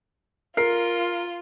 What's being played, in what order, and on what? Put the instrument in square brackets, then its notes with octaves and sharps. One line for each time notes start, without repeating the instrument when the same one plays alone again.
[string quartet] F4 [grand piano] A#4 C7